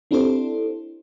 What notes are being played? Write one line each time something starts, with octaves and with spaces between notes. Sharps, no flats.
C4 D4 E4 G4 A4 C5